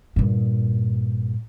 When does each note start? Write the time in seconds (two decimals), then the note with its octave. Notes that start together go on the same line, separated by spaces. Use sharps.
0.16 G2 A#2